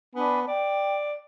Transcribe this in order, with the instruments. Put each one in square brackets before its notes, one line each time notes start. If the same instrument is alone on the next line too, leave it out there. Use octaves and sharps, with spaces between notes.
[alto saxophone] B3 [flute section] D4 G#5 B5
[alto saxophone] D5 [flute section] G5